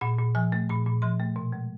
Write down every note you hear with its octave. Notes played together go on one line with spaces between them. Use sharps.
A#2 F#5
A#2
F3 G#5
A3
A#2 B5
A#2
F3 C6
A3
B2
G#3